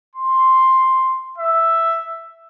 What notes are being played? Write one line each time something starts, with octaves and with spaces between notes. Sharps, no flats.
C6
E5